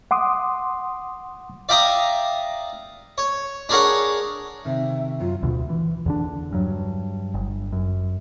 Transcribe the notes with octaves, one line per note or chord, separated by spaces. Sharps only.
F#5 C6 D6 D#6
D5 E5 F5 G5 A#5 D#6
C#5
D4 G#4 A#4 C#5 F#5
C3 D#3 E5
F#2 F4
D2 B2
E3
E2 D3 D4
G2 F#3
G1
F#2